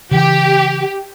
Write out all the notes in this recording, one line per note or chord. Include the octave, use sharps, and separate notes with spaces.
C#3 E3 G4